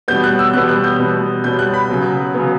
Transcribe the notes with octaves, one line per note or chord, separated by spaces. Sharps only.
B2 G3 B3 G6
F#6
E6
B2 G3 B3 F#6
F#6
G6
B2 G3 B3
B2 G3 B3 G6
F#6
B5
C#3 F#3 B3
C#3 F#3 B3